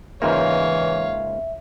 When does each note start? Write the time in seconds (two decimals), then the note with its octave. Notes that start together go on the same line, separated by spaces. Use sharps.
0.22 C#2 G#2 E3 A#3 C#5 E5 F5